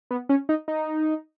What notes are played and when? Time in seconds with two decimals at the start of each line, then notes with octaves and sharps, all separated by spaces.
0.11 B3
0.29 C#4
0.49 D#4
0.68 D#4